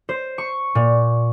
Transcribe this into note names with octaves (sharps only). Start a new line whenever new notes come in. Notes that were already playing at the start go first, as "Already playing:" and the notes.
C5
C#6
A#2